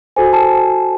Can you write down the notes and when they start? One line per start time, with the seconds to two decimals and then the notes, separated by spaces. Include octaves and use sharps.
0.16 F#4 A4 C5 G#5
0.33 A5